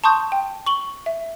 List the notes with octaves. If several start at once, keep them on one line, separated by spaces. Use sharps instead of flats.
A5 C6 C#6 D#6 G6
G5
C#6 F#7 G7
E5